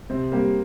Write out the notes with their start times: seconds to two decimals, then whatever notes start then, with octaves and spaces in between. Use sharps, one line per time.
0.10 C3 C4
0.32 G3 A#3 C4 G4